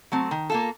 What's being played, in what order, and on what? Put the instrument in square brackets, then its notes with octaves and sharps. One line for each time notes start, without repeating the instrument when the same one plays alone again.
[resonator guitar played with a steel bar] F#3 A3 C4
D#3
A#3 F4 A4